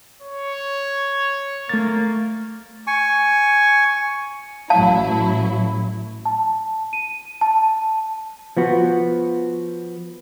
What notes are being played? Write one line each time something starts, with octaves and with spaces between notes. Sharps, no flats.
C#5
A3 A#3 A6
G#5 C#6
A1 F#3 E4 F5 A5
A5
D#7
A5
F3 B3 F#4